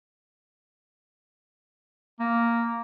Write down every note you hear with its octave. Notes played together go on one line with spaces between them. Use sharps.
A#3